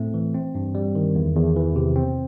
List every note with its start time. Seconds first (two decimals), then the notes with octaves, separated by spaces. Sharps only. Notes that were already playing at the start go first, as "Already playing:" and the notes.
Already playing: A2 A3 C4
0.14 E3
0.34 C4
0.55 G2
0.75 G3
0.95 D#3
1.15 E2
1.35 E2
1.56 E3
1.76 C3
1.96 C4